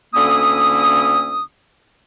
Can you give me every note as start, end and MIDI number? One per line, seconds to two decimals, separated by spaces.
0.15 1.44 38
0.15 1.44 50
0.15 1.44 58
0.15 1.44 61
0.15 1.44 64
0.15 1.44 87